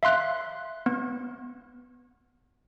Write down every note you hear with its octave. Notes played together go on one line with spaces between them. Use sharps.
E5 F5 C6 F#6
B3